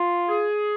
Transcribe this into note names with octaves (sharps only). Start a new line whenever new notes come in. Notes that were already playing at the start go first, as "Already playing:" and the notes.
Already playing: F4
G#4